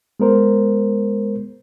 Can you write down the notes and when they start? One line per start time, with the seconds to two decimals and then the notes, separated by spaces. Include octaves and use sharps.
0.20 G#3 B3 A#4 C5